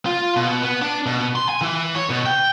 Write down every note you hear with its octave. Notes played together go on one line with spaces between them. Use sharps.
F4
B2
B3
D4
B2
C6
G#5
E3
C#5
B2
G5